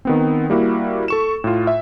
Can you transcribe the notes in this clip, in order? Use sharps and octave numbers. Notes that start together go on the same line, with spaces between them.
D#3 B3 C4
G3 A#3 E4 F#4
A4 C#6 E7
A2 F4
E5